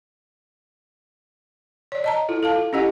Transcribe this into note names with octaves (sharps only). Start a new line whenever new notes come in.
C#5 D5
D#5 A5 A#5
E4 F4 A4
A4 F5 A5
F4
C#4 E4 G4 D#5 F#5 G#5